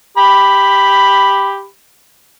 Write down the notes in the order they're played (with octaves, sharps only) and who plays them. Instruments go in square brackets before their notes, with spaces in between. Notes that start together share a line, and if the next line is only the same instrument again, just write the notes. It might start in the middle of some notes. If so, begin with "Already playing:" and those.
[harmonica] G4 B5